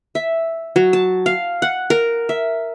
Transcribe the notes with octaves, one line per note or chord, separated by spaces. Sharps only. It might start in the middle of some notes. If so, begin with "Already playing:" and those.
E5
F#3
A5
F5
F#5
A#4
E5